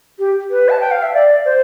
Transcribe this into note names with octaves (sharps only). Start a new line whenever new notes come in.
G4
B4
A5
G5
F5
E5
D5
C5